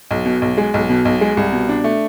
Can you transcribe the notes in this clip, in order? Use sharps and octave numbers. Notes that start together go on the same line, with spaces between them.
B1
B2
B1
G#3
B1
B2
B1
G#3
C2
B2
D4
A3